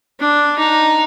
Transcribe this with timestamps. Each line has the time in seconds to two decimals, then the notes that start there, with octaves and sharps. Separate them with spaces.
0.20 D4
0.58 D#4